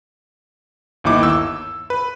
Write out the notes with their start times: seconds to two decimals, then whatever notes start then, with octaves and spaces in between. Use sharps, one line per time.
1.04 G1 D#2 D#4 E4 D6
1.23 E6
1.90 B4